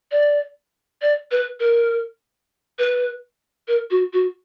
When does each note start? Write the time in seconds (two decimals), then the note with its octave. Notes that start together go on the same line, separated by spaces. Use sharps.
0.11 D5
1.02 D5
1.31 B4
1.60 A#4
2.79 B4
3.68 A#4
3.91 F#4
4.13 F#4